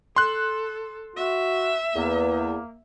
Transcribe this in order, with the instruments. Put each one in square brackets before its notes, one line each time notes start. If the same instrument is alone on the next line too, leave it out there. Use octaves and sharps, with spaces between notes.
[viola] A4 [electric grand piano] C6 F#6
[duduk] F#4 [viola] E5
[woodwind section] E2 [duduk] A#3